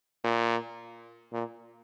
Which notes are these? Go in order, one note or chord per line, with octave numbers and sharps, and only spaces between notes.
A#2
A#2